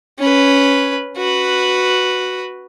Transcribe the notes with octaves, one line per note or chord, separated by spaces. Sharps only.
C#4 B4
F#4 B4